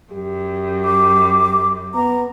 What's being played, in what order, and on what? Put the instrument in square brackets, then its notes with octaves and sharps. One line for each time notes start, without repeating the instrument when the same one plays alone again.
[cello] F#2 [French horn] G4
[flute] D6
[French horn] B3 [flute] A#5